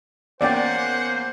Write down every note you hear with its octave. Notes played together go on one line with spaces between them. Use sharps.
E2 A#3 C#4 C5 D5 F#5 G5